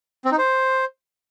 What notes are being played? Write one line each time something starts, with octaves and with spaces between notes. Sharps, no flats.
C4
D#4
C5